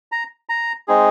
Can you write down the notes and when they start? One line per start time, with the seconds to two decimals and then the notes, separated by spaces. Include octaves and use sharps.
0.12 A#5
0.49 A#5
0.88 G#3 C4 D#4 G#4